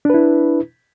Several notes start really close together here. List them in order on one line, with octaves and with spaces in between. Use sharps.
D4 B4 E4